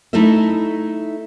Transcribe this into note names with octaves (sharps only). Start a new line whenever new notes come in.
A3 D#4 E4 A4 D#5 E5